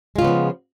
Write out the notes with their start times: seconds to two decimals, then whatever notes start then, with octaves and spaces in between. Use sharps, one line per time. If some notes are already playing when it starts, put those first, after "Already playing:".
0.16 G#3
0.18 F4
0.21 C#3
0.24 B3
0.27 F3